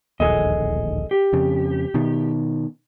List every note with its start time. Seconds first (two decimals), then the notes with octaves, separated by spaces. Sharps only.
0.20 D1 A#1 D#2 G#4 A4 D#5
1.11 G4
1.33 F2 C#3
1.94 B2 D#3